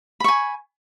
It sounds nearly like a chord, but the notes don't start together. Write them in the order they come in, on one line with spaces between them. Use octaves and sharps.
B5 C#6 G#5